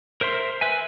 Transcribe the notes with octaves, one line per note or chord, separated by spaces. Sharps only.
A#4 C5 E5 C6
B4 E5 G#5